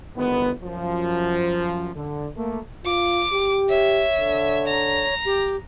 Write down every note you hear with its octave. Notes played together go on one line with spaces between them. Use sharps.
G1 D#3 G#3 B3
F#2 F3
D3
A3 A#3
F4 D6
G4
C#5 E5
D3
A#5
G4